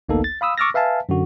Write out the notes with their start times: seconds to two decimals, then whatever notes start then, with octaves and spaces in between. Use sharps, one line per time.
0.09 A1 D2 A#3 B3 D#4 A4
0.24 A6
0.41 F5 B5 D#6 E6
0.58 C#6 D6 E6 F6 A6 A#6
0.74 B4 E5 F5 G#5 A5
1.09 F#2 D3 F#4